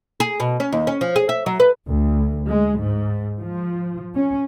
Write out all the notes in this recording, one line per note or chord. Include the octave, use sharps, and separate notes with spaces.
G#4
B2
C#4
D#2
C#4
F3
G#4
E5
F#3
B4
D2
G#3
G#2
F3
C#4